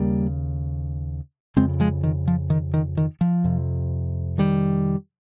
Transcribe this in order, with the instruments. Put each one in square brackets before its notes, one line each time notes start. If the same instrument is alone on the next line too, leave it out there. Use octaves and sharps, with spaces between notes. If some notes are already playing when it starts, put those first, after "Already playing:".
Already playing: [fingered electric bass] D#2 C#3 G3 A#3
F2 C#3 G#3 C4
F3 G#3
D#3
F3
D#3
D#3
D#3
F3
F2 C3
D#3 G3